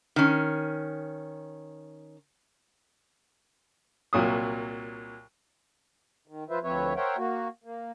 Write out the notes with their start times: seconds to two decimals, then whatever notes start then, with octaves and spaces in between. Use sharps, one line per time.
0.16 D#3 C#4
4.13 C2 A#2 F#3 D#6
6.27 D#3
6.50 F3 F4 B4 C5 E5
6.64 D2 F3 C4 B4 C#5 E5
6.96 A#4 C5 C#5 E5 F#5 G5
7.17 A#3 F#4
7.64 A#3